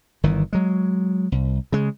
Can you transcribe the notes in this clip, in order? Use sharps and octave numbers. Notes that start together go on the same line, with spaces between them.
G1 D#3 E3
F#3 G#3
C2
C#3 G#3